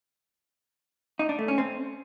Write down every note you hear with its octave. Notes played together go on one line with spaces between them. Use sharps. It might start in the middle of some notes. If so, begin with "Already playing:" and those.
D#4
D4
A3
C#4
C4